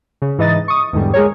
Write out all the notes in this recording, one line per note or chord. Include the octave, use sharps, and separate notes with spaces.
C#3
G#2 E3 D#4 D#5 A6
C#6 D#6
E2 G#2 D3 G3
G#3 G#4 A#4 C#5